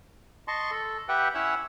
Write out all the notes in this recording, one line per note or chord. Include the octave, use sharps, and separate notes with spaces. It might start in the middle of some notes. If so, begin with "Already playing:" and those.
D#5 A5 C6 C#6
A4
G4 B4 E5 F#5 G5
C#4 E4 C#5 F#5 E6